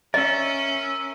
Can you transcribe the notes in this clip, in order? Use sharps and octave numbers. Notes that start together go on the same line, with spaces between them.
C#4 A#4 D#5 E5